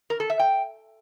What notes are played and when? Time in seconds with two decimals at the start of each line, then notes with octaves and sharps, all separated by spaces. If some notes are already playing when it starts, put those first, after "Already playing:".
0.10 A#4
0.20 A4
0.30 E5
0.39 G5